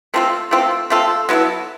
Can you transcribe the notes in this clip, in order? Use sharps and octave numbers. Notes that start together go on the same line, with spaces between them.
A3 C4 F4 A4
A3 C4 F4 A4
A3 C4 F4 A4
F#3 B3 E4 A4